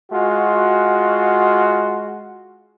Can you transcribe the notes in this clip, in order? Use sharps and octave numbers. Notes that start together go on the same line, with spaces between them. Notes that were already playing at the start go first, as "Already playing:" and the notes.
G#3 F4 F#4